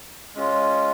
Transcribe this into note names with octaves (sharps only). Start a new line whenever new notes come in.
G#3 C#4 F4